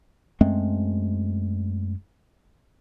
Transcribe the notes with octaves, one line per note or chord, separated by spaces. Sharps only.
F#2 G#3 A3 C4